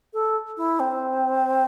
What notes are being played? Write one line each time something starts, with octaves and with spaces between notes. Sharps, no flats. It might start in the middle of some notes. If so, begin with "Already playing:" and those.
A4
E4
C4